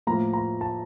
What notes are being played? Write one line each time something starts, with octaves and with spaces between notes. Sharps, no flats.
A2 F3 A#3 A#5
A#5
A5